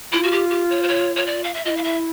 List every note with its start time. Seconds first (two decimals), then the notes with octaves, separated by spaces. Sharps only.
0.12 E4 F4
0.23 F#4
0.32 G4
0.50 G4
0.70 C#5
0.83 C5
0.88 C#5
1.16 C#5
1.26 D5
1.44 F5
1.54 E5
1.65 F4 D#5
1.69 E4
1.77 F5
1.84 E5